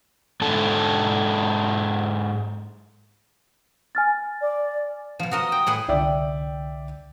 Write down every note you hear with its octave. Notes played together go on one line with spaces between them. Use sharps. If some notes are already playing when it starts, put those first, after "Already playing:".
G#2 D4 A4 A5
G#5 F6 A6
D5
B2 F3 E7
F#4 A#4 D#5 D#6
G5
A2 G#4 B4
C2 D3 D5 E5 G5